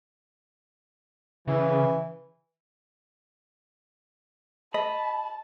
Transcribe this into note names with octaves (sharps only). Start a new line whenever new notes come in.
C#3 E3
D#5 A5 B5